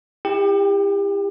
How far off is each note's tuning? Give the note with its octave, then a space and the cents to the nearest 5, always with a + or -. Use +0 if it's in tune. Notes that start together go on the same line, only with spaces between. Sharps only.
E4 +10 G4 +35 G5 +0